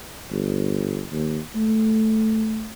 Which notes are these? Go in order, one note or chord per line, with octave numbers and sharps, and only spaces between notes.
G1
D#2
A3